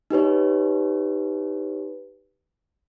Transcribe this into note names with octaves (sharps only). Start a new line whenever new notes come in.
D#4 G4 B4 C#5